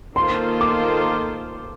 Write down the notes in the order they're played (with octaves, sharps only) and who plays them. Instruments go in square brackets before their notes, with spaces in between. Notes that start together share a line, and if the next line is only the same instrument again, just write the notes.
[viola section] D#3 A#3 F4 A4 C5 [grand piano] C6
[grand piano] D6